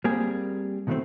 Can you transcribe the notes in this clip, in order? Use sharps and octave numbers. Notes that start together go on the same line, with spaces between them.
G3 A#3 C4 G4 G#4
B2 D#3 E3 G3 A3 C4